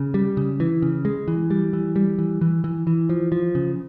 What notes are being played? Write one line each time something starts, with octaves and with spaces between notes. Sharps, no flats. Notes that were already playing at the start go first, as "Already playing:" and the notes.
Already playing: C#3
G3
C#3
E3
C#3
G#3
E3
G3
E3
G3
E3
E3
E3
E3
F3
F3
C#3